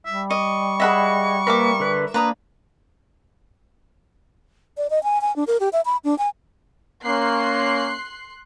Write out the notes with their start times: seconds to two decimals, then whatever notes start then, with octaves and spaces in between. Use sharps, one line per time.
0.06 G3 E5
0.30 D#5 C#6
0.80 G#4 D#5 E5 F#5 B5
1.47 A#3 A#4 B4 E5 D6
1.80 D3 B4
2.14 A#3 D4 B4 A#5 D#6
4.78 D5
4.90 D#5
5.04 G#5
5.21 G#5
5.36 D4
5.47 A#4
5.60 G4
5.73 E5
5.86 B5
6.04 D4
6.18 G#5
7.05 A#3 C#4 C6 F#6 C7